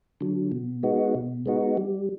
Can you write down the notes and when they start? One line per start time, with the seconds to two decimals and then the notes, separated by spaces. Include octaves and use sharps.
0.21 D3 F#3
0.52 B2
0.83 G#3 B3 D#4 F#4
1.15 B2
1.46 G#3 B3 D#4 F#4
1.77 G3